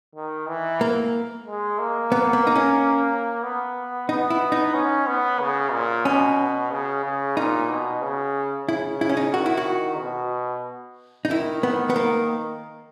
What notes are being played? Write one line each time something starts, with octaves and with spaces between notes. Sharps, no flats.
D#3
E3
A#3
G#3
A#3
B3
B3
D#4
C#4
B3
B3 D#4
E4
D#4
C#4
B3
C#3
A#2
B2 C#4
C#3
C#3
A#2 D#4
B2
C#3
C#3 E4
E4
C#4
D#4
D#3 F#4
E4
F#4
B2
D#4
D#3 E4
B3
B3
A#3